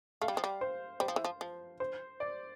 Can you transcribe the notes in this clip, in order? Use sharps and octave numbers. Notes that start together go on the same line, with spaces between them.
A3 F5
G3
F3
G3
C5
G3 C5
F3
E3
F3
F3
C5
D5